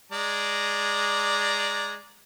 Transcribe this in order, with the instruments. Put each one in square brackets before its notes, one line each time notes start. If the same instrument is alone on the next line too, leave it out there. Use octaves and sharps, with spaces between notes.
[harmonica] G#3 D5 A#5